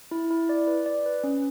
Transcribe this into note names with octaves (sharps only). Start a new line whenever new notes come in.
E4
E4
D5
B4
D5
B4
C#4